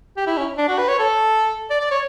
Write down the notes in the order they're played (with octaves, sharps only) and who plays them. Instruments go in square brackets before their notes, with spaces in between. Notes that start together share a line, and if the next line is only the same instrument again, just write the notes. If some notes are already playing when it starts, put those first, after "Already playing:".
[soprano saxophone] G4
E4
C#4
D4
F#4
B4
C#5
A4
D5
D5
C#5